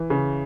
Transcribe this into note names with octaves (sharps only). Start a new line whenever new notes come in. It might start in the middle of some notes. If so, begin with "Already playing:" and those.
Already playing: E3
C#3